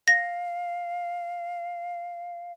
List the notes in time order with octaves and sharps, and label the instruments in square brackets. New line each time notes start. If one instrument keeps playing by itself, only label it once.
[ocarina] F5 [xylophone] A#6